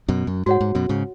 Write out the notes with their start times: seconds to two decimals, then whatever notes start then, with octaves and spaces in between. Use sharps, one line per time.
0.09 F#2 B2
0.27 F#2
0.46 G#2 F#4 C#5 F#5
0.61 G#2
0.75 F#2 B2
0.89 G#2 C#3